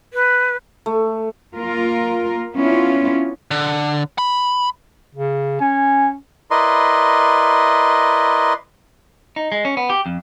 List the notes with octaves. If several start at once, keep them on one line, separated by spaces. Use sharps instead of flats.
B4
A3
A#3 F4 A#4
B3 C#4 D4 E4 F4
D3
B5
C#3
C#4 G#5
E4 A#4 B4 D5 D#5 C6
D#4
G#3
C#4
B3
G4
F2